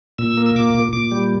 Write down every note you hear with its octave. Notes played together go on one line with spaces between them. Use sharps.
A#2 E6
A#3
E6
A#2 D6
A#2
A#2 D6
G3